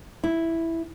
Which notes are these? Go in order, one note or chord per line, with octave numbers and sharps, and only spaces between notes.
E4